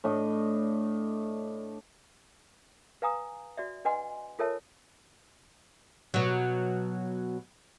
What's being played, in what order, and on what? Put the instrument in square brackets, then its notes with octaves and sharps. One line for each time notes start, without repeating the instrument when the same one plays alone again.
[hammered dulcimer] A2 D4 D#5
[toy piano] B4 F5 G#5 A#5 D#6
F#4 D5 E5
D4 B4 D#5 F#5 G#5 C6
F4 A4 A#4 C#5 E5 A5
[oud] B2 F#3